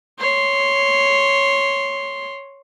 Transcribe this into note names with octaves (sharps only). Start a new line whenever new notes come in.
C#5 C6